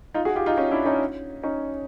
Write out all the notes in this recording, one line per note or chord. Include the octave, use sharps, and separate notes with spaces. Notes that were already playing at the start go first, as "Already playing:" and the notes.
D#4 F4
F#4 G#4
F4 G4
D#4 F4
C#4 D#4
D4 E4
C#4 D#4
C#4 D#4